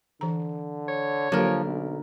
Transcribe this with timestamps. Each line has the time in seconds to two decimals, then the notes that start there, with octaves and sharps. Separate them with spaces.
0.21 D3 E3 A#5
0.88 C#5
1.32 D3 F3 F#3 A#3 G4 A#4
1.65 B1